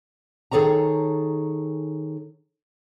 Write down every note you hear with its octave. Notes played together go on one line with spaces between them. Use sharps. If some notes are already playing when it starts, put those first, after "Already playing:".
D#3 G#4 A4 C#5 A#5